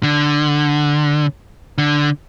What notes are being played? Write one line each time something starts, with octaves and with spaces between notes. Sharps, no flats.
D3
D3